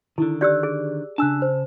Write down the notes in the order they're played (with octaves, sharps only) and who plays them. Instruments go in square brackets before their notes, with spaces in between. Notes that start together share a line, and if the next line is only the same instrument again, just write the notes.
[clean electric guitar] D3 D#3 [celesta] E4
[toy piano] G4 D5 [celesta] E6 F#6 G6
[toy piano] G#4
[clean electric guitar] C#3 A5 [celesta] D4 E6 F#6
[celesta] C5